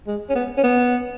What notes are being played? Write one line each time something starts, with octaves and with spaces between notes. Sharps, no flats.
G#3
C#4
B3
C#4
B3